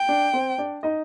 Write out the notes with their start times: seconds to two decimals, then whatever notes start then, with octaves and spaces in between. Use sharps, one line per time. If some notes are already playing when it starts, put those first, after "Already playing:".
Already playing: G5
0.09 D4
0.33 C4 C5
0.58 D4 D5
0.83 D#4 D#5